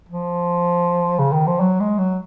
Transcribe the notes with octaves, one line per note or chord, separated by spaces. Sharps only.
F3
C#3
D#3
F3
F#3
G#3
F#3